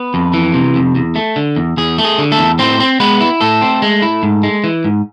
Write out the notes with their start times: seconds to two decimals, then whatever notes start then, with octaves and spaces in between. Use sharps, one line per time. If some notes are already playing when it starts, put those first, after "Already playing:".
Already playing: B3 B4
0.14 F2
0.33 E3
0.54 C3
0.75 F2
0.95 E2
1.16 A3
1.36 D3
1.56 E2
1.77 E2 G#4
1.98 A3
2.05 G#4
2.18 D3
2.32 A3 A4
2.38 E2
2.59 A2 C4 C5
2.80 C4
3.00 G#3 B3 B4
3.21 E4
3.41 A2 A3 A4
3.61 C4
3.82 G#3
4.02 E4
4.23 G#2
4.43 G#3
4.64 E3
4.84 G#2